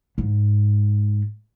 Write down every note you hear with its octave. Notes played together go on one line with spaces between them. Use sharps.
G#2